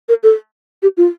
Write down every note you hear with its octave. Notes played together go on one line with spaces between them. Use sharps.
A#4
A4
G4
F4